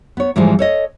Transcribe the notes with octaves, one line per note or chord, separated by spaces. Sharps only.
B3 C#5
G#2 E3 F3 G3 G#3
A4 C#5 D#5